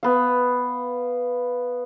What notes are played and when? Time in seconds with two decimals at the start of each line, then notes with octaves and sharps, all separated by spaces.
0.03 B3 F5